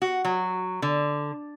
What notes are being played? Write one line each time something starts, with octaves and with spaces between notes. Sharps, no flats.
F#4
F#3
D3